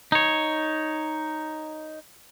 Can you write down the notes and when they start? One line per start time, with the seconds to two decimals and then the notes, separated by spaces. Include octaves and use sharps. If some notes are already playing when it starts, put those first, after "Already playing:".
0.12 D#4 C#5